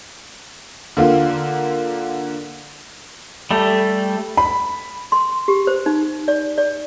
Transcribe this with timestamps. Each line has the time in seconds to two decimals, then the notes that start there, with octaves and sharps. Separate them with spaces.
0.97 D3 A#3 F4
3.51 G3 A3
4.37 B5
5.12 C6
5.48 G4
5.67 C5
5.86 D#4
6.28 D5
6.58 D5